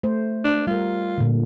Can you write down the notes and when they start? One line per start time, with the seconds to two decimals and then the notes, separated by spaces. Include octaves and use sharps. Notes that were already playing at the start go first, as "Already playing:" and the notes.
0.03 A3 C5
0.44 D4
0.67 G3 F4 A#4
1.18 A#2 D3